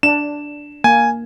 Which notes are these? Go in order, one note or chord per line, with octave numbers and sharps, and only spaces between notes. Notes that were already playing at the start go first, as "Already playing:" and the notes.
D4 E7
A#3 G#5